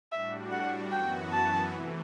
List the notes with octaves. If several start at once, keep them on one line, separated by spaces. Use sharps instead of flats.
A2 G3 D4 F#4 E5
F#5
F#2 E3 B3 F#4 G5
A5
C3 E3 A3